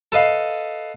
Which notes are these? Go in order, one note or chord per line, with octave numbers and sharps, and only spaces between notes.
A4 B4 D#5 F5